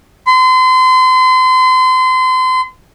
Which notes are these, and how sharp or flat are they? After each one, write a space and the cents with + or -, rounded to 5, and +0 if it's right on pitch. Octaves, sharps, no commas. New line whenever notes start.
C6 -35